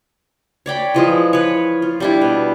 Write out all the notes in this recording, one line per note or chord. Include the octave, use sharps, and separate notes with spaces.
C#5 D5 G5 B5
E3 F3 G#3
B4 C#5
F4
G3 D4 E4
B2